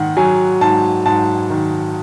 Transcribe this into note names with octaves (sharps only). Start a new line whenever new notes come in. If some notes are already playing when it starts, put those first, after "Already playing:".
Already playing: G#2 D#3 F#5
F#3 G#5
G#2 A5
G#2 A5
D#3